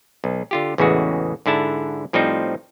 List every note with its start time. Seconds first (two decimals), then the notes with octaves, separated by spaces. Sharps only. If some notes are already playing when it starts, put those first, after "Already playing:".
0.24 B1
0.51 D3 F4 G4
0.78 A1 E2 C#3 E3 G#3 F#4
1.46 G#2 D3 E4 A5
2.13 A2 F3 G3 C4 D#4